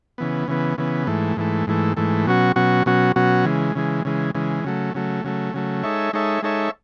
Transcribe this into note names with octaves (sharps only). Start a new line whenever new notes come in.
C#3 E3 B3
C#3 E3 B3
C#3 E3 B3
G#2 E3 A3
G#2 E3 A3
G#2 E3 A3
G#2 E3 A3
B2 F#3 C#4 F#4
B2 F#3 C#4 F#4
B2 F#3 C#4 F#4
B2 F#3 C#4 F#4
C#3 E3 G#3
C#3 E3 G#3
C#3 E3 G#3
C#3 E3 G#3
C#3 F#3 A3
C#3 F#3 A3
C#3 F#3 A3
C#3 F#3 A3
G#3 D#4 A4 C#5 E5
G#3 D#4 A4 C#5 E5
G#3 D#4 A4 C#5 E5